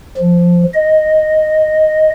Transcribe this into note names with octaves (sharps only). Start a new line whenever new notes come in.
F3
D#5